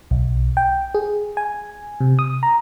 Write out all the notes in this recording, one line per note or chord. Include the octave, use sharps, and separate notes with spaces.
B1
G5
G#4
G#5
C3
D#6
A#5